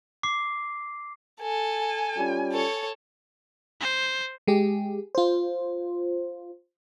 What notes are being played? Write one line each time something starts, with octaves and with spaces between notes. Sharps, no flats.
D6 C7
A4 G#5
G3 C#4 F4
A4 C#5
C5
G#3 G4 G#4
F4 C5